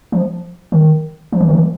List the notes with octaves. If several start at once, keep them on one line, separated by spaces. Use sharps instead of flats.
F3
D#3
F3
E3
D#3
E3